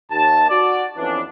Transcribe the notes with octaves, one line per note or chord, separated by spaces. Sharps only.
D#2 A5
F#4 D5
F2 E3 B3 C#4 D4